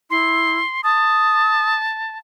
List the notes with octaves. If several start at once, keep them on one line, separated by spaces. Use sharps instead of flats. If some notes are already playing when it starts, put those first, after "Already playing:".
E4 C6
A5 D#6